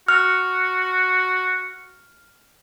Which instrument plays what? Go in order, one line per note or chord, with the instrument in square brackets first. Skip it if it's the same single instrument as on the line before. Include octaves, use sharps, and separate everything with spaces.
[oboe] F#4 [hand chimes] F6